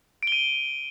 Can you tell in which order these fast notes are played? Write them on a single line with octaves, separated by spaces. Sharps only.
D7 G7 D#7